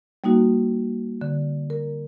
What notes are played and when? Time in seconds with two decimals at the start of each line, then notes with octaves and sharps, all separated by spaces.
0.24 G3 A#3 D#4 F#4
1.21 D3
1.70 A#4